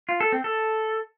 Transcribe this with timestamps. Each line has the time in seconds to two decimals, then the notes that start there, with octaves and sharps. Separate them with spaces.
0.09 F4
0.20 A4
0.32 C4
0.44 A4